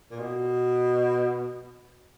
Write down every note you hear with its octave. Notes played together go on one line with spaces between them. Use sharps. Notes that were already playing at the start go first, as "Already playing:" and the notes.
A#2
B2